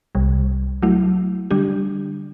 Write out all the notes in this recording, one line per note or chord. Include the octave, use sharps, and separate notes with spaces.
C2 C3 G3
F#3 A3 E4
D3 G3 D4 G4